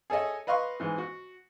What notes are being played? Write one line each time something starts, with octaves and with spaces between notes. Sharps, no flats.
G#4 A4 C#5 D#5 E5
B4 D#5 F5 C6 C#6
G#2 E3
F#4